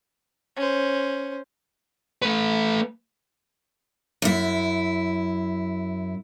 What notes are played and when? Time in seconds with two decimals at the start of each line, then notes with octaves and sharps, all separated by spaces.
0.56 C#4 C5
2.22 A3 B4
4.22 F#2 E4